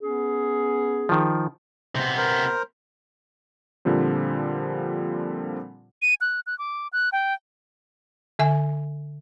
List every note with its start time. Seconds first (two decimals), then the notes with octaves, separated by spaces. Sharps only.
0.02 B3 C#4 G#4
1.09 D#3 F3
1.95 C3 B3 C5
2.17 A#4 C5
3.85 A#2 D3 F3 G3 C4
6.02 D#7
6.21 F#6
6.47 F#6
6.59 D6
6.93 F#6
7.12 G5
8.39 D3 E5 G#5